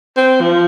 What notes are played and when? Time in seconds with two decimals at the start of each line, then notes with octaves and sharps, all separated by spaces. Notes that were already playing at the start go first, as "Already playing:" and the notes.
0.17 C4
0.41 F3